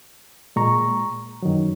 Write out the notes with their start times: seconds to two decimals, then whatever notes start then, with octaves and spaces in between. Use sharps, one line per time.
0.56 A#2 G#3 A#5 C#6
1.42 F#2 D#3 F#3